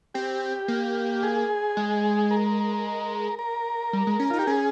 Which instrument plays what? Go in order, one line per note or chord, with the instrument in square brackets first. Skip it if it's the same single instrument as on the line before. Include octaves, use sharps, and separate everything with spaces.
[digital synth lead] C4 [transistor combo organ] G4
[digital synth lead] A#3
[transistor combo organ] G#4
[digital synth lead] G#3
[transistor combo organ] A#4
A#4
[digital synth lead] G3
G#3
C#4
[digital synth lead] D#4 [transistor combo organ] F4
[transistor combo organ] G4
[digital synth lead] C#4 [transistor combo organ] G#4